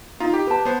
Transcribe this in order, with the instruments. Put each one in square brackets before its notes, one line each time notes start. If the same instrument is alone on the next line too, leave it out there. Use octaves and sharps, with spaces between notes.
[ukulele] D#4 [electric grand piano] F4
[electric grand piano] G4
[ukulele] B4 A5
[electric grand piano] B3 C5